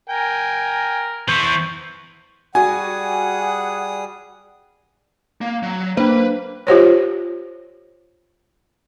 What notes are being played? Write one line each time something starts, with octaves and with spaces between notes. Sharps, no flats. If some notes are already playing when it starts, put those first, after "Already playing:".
A#4 G5 G#5
E3 B3 C5 C#6
G3 F#4 G#4 F#5 G#5 D#6
A#3
F#3
A#3 D4 B4 C5 B5
F4 G4 C5 C#5